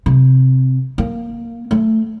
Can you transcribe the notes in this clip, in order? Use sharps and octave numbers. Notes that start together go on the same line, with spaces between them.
C3
A#3
A3